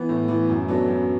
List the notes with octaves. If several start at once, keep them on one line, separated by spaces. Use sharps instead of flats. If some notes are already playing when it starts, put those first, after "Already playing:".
Already playing: E3 B3
A2
E3 B3
F#2
F#3 B3 D4 A4
F#2